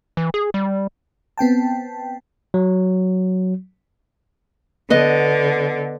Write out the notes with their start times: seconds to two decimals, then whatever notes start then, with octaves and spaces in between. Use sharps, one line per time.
0.17 E3
0.34 G#4
0.54 G3
1.38 B3 C4 G5 A5
2.54 F#3
4.90 D3 B3 D#5